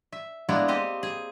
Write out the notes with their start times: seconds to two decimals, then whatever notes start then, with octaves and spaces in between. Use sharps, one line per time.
0.12 E5
0.49 G#3 A#3 B3 D4 E4
0.68 C4 G4 D#5
1.03 G#4